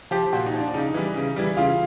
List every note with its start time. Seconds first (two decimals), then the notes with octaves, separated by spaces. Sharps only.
0.11 F3 G4
0.33 A#2 F#4
0.46 D#4
0.54 F3
0.60 D4
0.74 C#3 D#4
0.94 E3 G3
1.16 C#3
1.36 E3 G3
1.57 C#3 F4